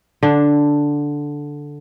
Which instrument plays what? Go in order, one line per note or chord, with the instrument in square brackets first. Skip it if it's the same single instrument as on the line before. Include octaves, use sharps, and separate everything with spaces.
[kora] D3 D4